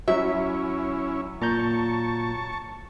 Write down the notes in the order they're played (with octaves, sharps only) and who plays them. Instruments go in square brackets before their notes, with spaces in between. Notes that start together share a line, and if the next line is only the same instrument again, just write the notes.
[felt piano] F#3 [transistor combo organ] C#4 E4 [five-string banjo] E5
[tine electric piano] A#2 A#5 G6 [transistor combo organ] A5 C#6